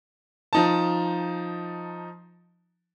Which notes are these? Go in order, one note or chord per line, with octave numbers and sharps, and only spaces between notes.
F3 D#4 A5